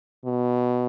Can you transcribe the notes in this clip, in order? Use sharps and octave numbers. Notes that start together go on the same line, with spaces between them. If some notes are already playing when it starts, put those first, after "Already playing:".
B2